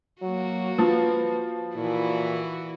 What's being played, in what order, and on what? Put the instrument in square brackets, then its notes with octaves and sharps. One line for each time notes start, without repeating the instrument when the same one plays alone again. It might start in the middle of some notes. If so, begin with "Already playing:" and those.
[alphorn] F#3 [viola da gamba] A#3 F#4
[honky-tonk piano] F3 F4 [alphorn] B4
[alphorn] A#2 [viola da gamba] E3 E4 F#4